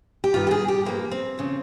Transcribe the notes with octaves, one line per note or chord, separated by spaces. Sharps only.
G4
G2 D#3 F4
G4
G#4
G4
G2 F3 A#3
C4
D#2 C#3 F3